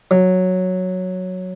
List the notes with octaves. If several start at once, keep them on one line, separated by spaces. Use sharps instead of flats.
F#3